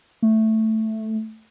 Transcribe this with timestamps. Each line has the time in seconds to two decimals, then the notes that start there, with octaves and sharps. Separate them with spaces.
0.22 A3